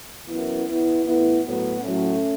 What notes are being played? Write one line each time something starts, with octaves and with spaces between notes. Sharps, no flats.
F#2 E3 B3 E4
E2 E3 B3 E4
A2 E3 B3 E4
A2 F#3 B3
A2 F#3 A3 C#4